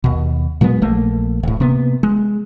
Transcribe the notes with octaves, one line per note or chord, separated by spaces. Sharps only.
D#2 B2
A#2 F#3 G#3 B3
A#1 A3 A#3
D1 A2
C3 A#3 B3
G#3